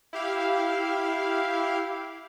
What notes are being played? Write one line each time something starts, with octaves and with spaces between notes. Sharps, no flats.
E4 G4 F5